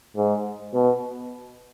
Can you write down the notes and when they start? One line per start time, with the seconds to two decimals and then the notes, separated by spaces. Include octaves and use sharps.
0.16 G#2
0.74 B2